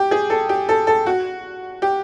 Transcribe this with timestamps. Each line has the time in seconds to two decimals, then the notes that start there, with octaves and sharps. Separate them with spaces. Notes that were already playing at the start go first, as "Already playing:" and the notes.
Already playing: G4
0.11 G#4
0.30 A4
0.49 G4
0.69 A4
0.87 A4
1.06 F#4
1.82 G4